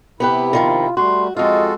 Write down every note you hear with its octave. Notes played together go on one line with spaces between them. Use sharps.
C3 B3 E4 G4 B4
D3 D#3 F3 F4
G3 A3 F#4 C6
F2 G#3 F4 F#4 A4 D#5